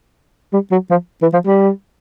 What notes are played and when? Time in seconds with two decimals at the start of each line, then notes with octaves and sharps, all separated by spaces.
0.53 G3
0.72 F#3
0.90 F3
1.22 E3
1.34 F3
1.46 G3